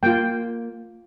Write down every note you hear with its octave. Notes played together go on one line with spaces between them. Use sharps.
A#3 F4 G5